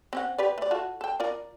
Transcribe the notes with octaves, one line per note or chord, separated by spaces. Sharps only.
C4 C#4 F#5
G4 B4 D5
A3 D5
F4 F#4 A4
A4 G5
F4 A#4 D5